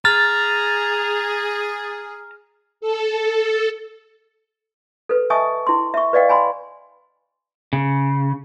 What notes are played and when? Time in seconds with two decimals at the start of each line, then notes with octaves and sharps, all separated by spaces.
0.05 G#4 A#5 F6 A6
2.81 A4
5.09 A4 B4
5.30 D#5 E5 G#5 A5 C#6 D#6
5.67 E4 C6
5.94 E5 C#6
6.13 B4 D5 D#5 F5 G5
6.29 G#5 B5 C6
7.73 C#3